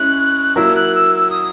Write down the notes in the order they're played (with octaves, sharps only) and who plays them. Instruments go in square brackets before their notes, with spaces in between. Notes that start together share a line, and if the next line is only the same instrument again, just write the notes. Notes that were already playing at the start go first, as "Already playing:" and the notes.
Already playing: [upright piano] G#3 C#4 E4 [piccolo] F#6
[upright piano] F#3 A#3 E4 A#4 [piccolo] E6
[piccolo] F#6
E6
E6
D#6